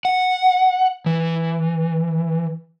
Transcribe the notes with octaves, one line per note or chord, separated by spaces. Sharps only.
F#5
E3